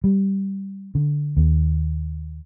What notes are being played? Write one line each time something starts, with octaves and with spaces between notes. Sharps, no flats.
G3
D3
D#2